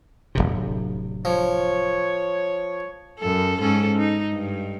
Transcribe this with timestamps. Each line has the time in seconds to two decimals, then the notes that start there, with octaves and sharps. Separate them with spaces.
0.35 D1 G1 C3
1.25 F3 C#5
3.20 F#2 A4
3.61 G#2 C#4 A4
3.98 D#4
4.32 G2